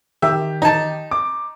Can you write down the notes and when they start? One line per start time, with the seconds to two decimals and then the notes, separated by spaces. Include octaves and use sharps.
0.22 D#3 G4 E5
0.62 D#4 A5
1.11 D6